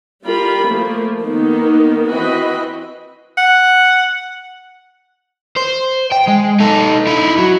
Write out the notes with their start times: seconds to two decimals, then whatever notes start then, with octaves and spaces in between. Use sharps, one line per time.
0.24 G3 F4 A#4 B5
0.69 F3 A3 A#3
1.22 D#3 A#3 B3 D#4
2.09 E3 C4 F#4 D#5 B5
3.38 F#5
5.57 C5
6.12 G5
6.27 G#3
6.60 D#4 A4
7.07 D#4 E4
7.38 F#3